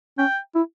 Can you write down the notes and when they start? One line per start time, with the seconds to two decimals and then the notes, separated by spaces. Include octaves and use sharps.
0.18 C#4 G5
0.55 E4